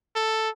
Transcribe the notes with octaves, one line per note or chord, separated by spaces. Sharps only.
A4